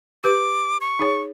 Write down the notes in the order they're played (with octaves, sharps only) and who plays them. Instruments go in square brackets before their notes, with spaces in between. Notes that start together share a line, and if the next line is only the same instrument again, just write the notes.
[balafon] G4 B4 [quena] D6
[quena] C#6
[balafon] D#4 G#4 C#5